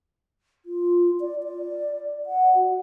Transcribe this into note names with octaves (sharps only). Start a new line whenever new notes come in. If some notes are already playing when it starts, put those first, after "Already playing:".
F4
D5
D5
F#5
F#4